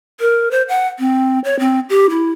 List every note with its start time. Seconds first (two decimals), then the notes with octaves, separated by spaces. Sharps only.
0.20 A#4
0.51 C5
0.69 F#5
0.99 C4
1.44 C#5
1.59 C4
1.90 G4
2.10 E4